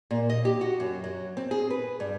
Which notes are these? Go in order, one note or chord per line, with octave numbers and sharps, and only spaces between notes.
A#2
D#5
G4
F#4
F#2
F#3
C4
G#4
B4
G2